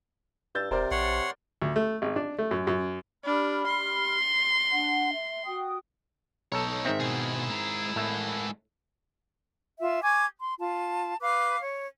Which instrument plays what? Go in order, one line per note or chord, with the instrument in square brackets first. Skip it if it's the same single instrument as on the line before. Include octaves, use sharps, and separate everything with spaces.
[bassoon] G2 [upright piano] E6 G6 A6
[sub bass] E1 [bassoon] C3 [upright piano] A#4 C5 D5
[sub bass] A#1 [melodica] C#5 F#5 C6
[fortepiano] D2
A3
G#1
D4
A3
F#2
F#2
[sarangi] D4 [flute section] G4 B5 F6
[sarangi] C6
[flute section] D4 F#5
E5
F#4 G5 D#6
[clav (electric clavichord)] B1 A4 [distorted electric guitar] D#4 C#5
[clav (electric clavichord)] G#2 D#3 C4 [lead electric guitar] E5
[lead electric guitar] B2 [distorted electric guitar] E4 G#4
[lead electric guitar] G#3 A#5
[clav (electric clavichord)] A2 E5 [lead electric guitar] G#3 A#4
[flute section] F4 E5
G#5 C#6 D6 G#6
C6
F4 A5
B4 F5 D6
C#5